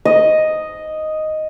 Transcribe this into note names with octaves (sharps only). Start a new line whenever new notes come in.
D#5